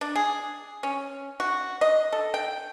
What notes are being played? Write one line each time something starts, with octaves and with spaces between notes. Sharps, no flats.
D4
G#4
C#4
F#4
D#5
A4
G5